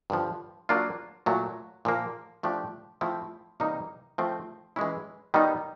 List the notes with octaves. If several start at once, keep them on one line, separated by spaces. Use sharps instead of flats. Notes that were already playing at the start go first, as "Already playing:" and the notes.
G2 D3 F3
F#3 A#3 D4 F4
A#2 F#3 A3
A#2 F3 A#3
F3 A3 D4 G4
F3 A3 C4 E4
C3 E3 G3 A#3 D#4
F3 A3 C4
E3 G#3 C#4 E4
D#3 G3 B3 D#4